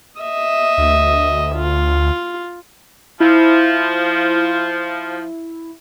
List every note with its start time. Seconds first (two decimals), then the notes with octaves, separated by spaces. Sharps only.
0.20 D#5 E5
0.78 D2
1.56 F4
3.20 F3 E4